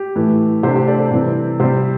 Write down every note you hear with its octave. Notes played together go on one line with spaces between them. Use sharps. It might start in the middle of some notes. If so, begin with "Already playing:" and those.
Already playing: G4
A2 E3 A3
C3 A3 D4 G4 C5
G4 C5
A4 D5
C5
A4 D5
C3 E3 G3 C4
C3 G3 C4 G4 C5